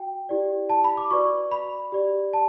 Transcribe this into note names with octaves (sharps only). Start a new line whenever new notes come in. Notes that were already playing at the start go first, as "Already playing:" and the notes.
Already playing: F#4 G5
E4 G4 D5
A5
B5
D6
F#4 B4 D5 C#6
B5
G4 D5
A5